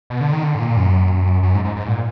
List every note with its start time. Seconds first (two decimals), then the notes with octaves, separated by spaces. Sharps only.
0.10 B2
0.21 D3
0.33 D#3
0.43 D3
0.55 G#2
0.60 A#2
0.77 F#2
1.43 F#2
1.54 G#2
1.65 G#2
1.76 G#2
1.87 A#2